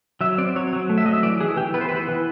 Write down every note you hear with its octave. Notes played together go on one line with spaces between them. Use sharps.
F#3 E5
C4 D5
F#3 C#5
F#3
A3
E5
F#3 D#5
E5
E3 D5
E3 G#4
E3 G4
B3 B4
C5
E3 B4
E3